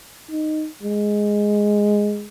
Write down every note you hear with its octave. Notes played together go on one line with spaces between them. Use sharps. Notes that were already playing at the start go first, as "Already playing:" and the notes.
D#4
G#3